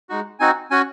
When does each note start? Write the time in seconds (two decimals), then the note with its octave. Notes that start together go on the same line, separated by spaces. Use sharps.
0.09 G#3 D#4 F#4
0.39 C4 D#4 F#4 G#5
0.71 C#4 F#4 G#5